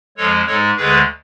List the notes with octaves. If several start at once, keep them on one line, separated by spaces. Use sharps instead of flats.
F2 F3 G#3 A4 C#5
G#2 G#3 A4 C#5
D2 D3 G#3 G#4 B4